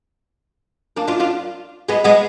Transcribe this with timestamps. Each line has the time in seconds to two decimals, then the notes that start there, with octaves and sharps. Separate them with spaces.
0.96 A#3 D4
1.08 D4 F4
1.20 D4 F4
1.88 G#3 B3
2.04 G#3 B3